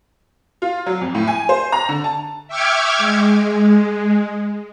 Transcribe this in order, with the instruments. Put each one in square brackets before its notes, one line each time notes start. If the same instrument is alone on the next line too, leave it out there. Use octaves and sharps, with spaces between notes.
[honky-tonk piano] F4
F#3
F2
A2
G#5
C5
A#5
D3
A5
[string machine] E5 G5 C#6 D6 F6 G#6
G#3